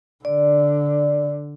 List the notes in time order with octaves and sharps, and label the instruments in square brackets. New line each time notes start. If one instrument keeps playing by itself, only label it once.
[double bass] D3 [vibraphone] D5